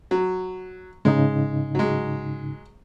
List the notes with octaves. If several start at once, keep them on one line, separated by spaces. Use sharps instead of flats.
F#3
G#2 C#3 G#3 D#4
F#3 G#3